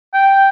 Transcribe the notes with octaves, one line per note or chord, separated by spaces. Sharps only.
G5